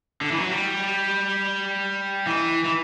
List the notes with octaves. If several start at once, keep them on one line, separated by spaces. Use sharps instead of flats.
D3
E3
F#3
G3
E3
E3